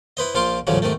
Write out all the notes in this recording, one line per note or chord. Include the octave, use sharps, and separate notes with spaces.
E4 B4 C5 D#5
A#1 F3 F4 C5 C6 D6
A1 D2 G#2 C#3 F3 F#3
G#2 C3 D#3 A3